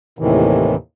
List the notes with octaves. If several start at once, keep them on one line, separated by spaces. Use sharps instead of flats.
D#2 A2 C3 D#3 E3